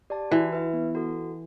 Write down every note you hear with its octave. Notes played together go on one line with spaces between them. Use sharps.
G4 D5 A5
E3 F#4
B4 E5
B3
F#4 A4